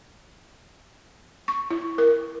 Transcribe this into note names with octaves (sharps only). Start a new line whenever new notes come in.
C#6
E4
A#4